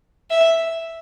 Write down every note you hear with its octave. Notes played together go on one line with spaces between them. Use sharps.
E5